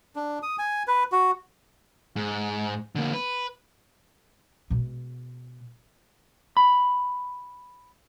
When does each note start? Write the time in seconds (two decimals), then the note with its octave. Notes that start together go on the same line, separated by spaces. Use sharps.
0.16 D4
0.43 D#6
0.59 G#5
0.87 B4
1.12 F#4
2.16 G#2
2.95 D3 A#3
3.14 B4
4.70 B2 G#3
6.57 B5